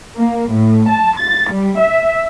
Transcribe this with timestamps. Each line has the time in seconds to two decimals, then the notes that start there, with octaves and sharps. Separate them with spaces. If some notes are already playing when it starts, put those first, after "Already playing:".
0.16 A#3
0.52 A2
0.89 A5
1.19 A6
1.52 G3
1.81 E5